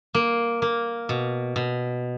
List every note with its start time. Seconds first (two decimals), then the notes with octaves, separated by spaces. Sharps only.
0.14 A#3
0.62 A#3
1.09 B2
1.56 B2